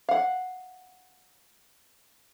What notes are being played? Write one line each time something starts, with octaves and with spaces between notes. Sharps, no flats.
F5 F#5